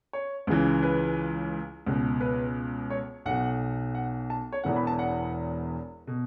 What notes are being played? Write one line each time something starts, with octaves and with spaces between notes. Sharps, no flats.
C#5
C#2 C#3 E3
B4
C#2 B2
B4
C#5
B1 B2 F#5
F#5
A5
C#5
E1 E2 E3 F#5
B5
A5
F#5
B2